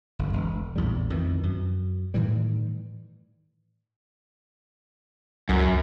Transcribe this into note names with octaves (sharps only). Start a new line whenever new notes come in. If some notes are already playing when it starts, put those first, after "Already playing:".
G1 F2
E1
A#1 E2 A2 G3
F2 D#3 E3
F#2
A2 D#3 E3 G3
C#2 F#2